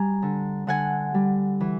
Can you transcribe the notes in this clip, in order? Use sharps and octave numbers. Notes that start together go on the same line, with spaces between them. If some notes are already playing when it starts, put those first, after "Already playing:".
Already playing: G3 G#5 A#5
D3
D3 F#5 G#5
G3
E3